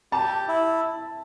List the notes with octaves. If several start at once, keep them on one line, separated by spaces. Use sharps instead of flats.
G4 A5
E4